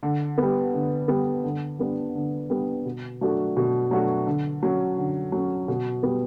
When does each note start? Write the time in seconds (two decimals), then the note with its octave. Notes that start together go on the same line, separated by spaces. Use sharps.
0.03 D3
0.38 G3 B3
0.74 D3
1.08 G3 B3
1.44 D3
1.79 G3 B3 D4
2.15 D3
2.50 G3 B3 D4
2.85 B2
3.21 F#3 A3 D4 F#4
3.57 B2
3.91 F#3 A3 D4 F#4
4.27 D3
4.63 F#3 C#4
4.98 D3
5.32 F#3 C#4
5.68 B2
6.03 G3 B3